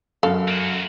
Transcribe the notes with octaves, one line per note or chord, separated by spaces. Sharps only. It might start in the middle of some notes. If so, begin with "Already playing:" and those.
F#2 A4 F5
A#3 F#4